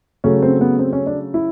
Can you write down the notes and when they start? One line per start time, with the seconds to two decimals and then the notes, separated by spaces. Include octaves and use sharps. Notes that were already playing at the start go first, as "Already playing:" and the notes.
0.24 C#3 F#3 A3 C#4
0.42 C4
0.61 B3
0.79 C4
0.93 C#4
1.07 D4
1.34 E4